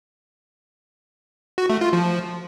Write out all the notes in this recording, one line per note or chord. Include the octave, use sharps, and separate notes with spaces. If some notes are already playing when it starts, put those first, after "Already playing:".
F#4
A3
F4
F3